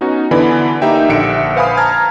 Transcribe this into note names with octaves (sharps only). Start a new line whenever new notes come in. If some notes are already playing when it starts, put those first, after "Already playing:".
B3 C#4 D#4 F#4
D3 E3 B3 D5 G#5 B5
A#3 D#4 G4 E5 G5
A#1 D3 E5 C#7 D7
B4 C5 F5 G#5 B5 D#6
A5 A#5 F6 G#6